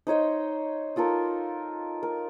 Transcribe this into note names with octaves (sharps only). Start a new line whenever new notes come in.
D#4 C5 C#5 D#5
D#4 F4 A4 A#4
A#4